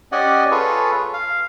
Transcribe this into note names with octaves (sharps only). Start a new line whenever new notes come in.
C#4 G4 D5 D#5 F#5 G#5
F4 G#4 A4 B4 C#5
F5